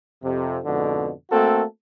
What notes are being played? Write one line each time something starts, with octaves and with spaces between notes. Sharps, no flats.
F2 C3
F2 G#2 B2 D3
A3 A#3 C4 F#4 A4